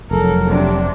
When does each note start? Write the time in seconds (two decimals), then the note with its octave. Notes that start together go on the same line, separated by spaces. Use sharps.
0.11 F1 F#3 A4 A#4
0.49 C3 D4